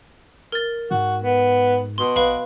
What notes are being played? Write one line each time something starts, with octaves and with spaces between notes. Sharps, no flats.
A#4 A6
G#2 F#4
B3
B2 C6
A#1 B4 F5 B5